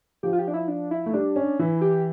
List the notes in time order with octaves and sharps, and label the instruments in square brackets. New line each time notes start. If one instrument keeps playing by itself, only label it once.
[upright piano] F3 [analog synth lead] G4
[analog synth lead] F4
G4
D4
E4
D4
E4
[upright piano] A3
[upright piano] G3 [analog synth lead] D4
[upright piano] C#4
[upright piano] E3 [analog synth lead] E4
[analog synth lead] G4